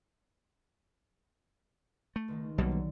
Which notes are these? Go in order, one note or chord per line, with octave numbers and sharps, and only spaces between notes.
A3
C#2 D#3 G#3
B1 B2 F#3 G3 A#3
D3